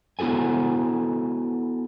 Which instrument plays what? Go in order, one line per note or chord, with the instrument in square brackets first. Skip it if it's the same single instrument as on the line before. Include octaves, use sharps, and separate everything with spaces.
[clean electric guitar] B3 E4 F#4 A4 G#5